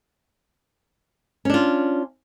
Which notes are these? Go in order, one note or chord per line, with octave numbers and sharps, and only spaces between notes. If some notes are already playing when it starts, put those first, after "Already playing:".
C#4 D4 F4